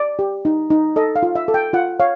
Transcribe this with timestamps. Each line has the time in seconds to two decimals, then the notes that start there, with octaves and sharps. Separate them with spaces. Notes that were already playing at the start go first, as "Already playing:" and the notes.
Already playing: D5
0.19 G4
0.45 D#4
0.70 D#4
0.96 A4 D#5
1.16 F5
1.23 F4
1.35 E5
1.48 A4
1.54 G5
1.73 F4 F#5
2.00 C#5 F5